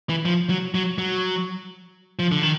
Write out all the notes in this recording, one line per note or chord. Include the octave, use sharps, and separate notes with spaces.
E3
F3
F#3
F#3
F#3
F3
D3
D#3